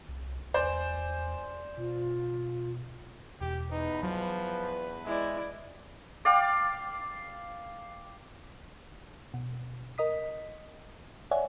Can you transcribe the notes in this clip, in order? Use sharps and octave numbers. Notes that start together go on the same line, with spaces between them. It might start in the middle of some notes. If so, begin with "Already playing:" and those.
C2
E2 C5 D5 G#5
B2 F4
E1 G4
E2 D#4 B4
F3 F#3
G#3 E4 D5
D5 F5 G5 D6
B2
A#4 D#5 D#6 B6
C#5 D5 E5 F#5 G#5